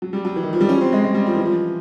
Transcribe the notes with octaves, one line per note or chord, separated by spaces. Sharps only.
F#3
G3
F#3
E3
D#3
F3
G3
C#4
C4
G#3
G#3
G3
F3
E3
F3